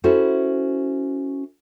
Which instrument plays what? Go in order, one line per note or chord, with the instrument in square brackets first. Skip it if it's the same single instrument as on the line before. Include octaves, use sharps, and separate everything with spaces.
[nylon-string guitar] C#4 E4 F#4 A4 C5